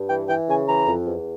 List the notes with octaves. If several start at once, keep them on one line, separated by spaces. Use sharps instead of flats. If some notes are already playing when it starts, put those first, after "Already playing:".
Already playing: G2
E3 G5
E3 G5
C#3 G#5
E3 A#5
F2
E2